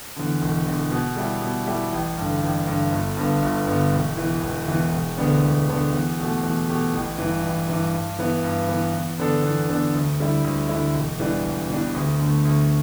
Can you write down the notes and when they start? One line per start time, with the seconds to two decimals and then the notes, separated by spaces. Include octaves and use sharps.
0.16 E2 D3
0.42 E1
0.66 E2 D3
0.91 B2
1.17 G3 E4 G4
1.42 B2
1.67 G3 E4 G4
1.92 A1
2.17 G2 D3
2.42 A1
2.67 G2 D3
2.92 G1
3.17 G2 D3 B3
3.42 G1
3.67 G2 D3 B3
3.92 E1
4.17 E2 E3
4.42 E1
4.68 E2 E3
4.93 E1
5.17 D2 D3 B3 D4
5.43 E1
5.68 D2 D3 B3 D4
5.93 E2
6.18 B2 A3 G4
6.43 E2
6.69 B2 A3 G4
6.93 A1
7.18 G2 E3
7.43 A1
7.69 G2 E3
7.94 G2
8.19 E3 B3
8.44 G2
8.68 E3 B3
8.94 E2
9.18 D3 B3 D4 A4
9.43 E2
9.68 D3 B3 D4 A4
9.94 D2
10.19 D3 G3 E4
10.44 D2
10.69 D3 G3 E4
10.94 E1
11.19 E2 E3 G3 D4
11.44 E1
11.70 E2 E3 G3 D4
11.95 D2
12.19 D3 A3
12.45 D2